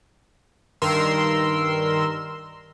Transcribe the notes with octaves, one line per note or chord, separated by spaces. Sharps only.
G2 D#3 A#4 C6 E6